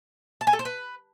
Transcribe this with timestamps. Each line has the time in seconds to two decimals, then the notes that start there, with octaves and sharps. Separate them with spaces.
0.41 A5
0.47 G#5
0.53 A4
0.59 C5
0.65 B4